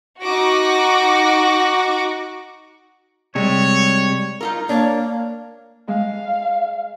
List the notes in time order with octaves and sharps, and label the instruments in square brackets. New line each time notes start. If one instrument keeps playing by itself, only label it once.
[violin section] D#4 F#4 C#6 D6 A#6
[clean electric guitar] C3 G3 G#3 [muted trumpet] C#5
[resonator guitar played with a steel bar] D#4 F4 A#4
[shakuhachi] A#3 [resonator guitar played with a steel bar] D4 C#5
[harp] G#3 [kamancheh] F5